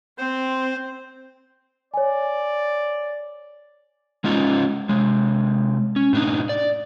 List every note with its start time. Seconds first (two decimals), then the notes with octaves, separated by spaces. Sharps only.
0.18 C4 C5
1.94 C#5 D5 G#5
4.24 G#3 C#4 D#4 F4
4.89 C3 G#3
5.96 C#4
6.13 A2 D4 D#4
6.49 D5